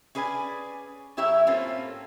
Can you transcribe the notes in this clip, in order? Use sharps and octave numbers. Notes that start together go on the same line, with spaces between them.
C#4 G#4 B4 D5 G#5
F#2 E4 G4 C#5 E5 A#5
A2 A3 A#3 C4 C#4 F4